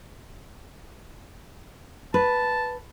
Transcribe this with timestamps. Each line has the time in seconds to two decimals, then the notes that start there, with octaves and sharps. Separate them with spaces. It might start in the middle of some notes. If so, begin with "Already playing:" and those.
2.14 B4 A5